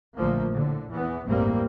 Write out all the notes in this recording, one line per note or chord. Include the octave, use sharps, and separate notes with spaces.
A#1 A#2 D3 F3 A3 A#3
A2 D3
E2 E3 B3
A1 E2 G2 G3 A#3 C4